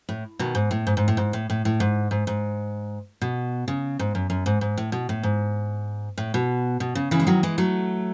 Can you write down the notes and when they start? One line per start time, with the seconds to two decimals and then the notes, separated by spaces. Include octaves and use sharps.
0.09 A2
0.39 B2 D#3
0.55 G#2
0.71 A2
0.87 G#2
0.97 G#2
1.08 A2
1.17 G#2
1.33 A2
1.50 A2
1.65 A2
1.80 G#2
2.11 G#2
2.27 G#2
3.21 B2
3.68 C#3
3.99 G#2
4.15 F#2
4.30 F#2
4.46 G#2
4.61 G#2
4.77 A2
4.92 B2
5.09 A2
5.23 G#2
6.18 A2
6.34 B2
6.80 B2
6.95 C#3
7.11 C#3 E3
7.20 G#3
7.27 D#3 F#3
7.43 E3 G#3
7.58 F#3 A3